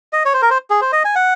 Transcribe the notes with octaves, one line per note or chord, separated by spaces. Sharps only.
D#5
C#5
C5
A#4
C5
G#4
C5
D#5
G#5
F#5